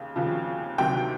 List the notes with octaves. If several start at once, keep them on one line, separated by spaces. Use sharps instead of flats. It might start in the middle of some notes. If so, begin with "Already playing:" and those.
Already playing: D#2 C#3
D#2 C#3 F3
D2 C3 D#3 F#3 G5